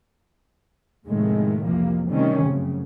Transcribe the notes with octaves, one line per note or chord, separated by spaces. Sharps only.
F1 D#2 A2 D#3 G#3 A3
C2 F2 C3 E3 F3 A#3
C3 D#3 G3 A3 C4 C#4
F1 F#2 C#3